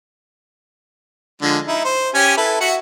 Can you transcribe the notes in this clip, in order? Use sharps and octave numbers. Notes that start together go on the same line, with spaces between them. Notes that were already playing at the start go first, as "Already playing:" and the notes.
D3 F3 G#3
D#4 E4
C5
C#4 G4 G#5
E4 A4 B4
F#4 E5 F#5